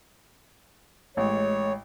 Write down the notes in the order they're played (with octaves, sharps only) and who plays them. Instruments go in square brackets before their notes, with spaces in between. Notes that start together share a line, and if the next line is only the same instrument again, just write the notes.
[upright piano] A1 [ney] G#3 [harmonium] C#5